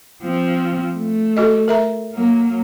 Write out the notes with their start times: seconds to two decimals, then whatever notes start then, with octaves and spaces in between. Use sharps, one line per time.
0.23 F3 C4
0.94 A3
1.37 F#4 A4 D#5
1.68 A#4 E5 A#5
2.14 F#3 A#3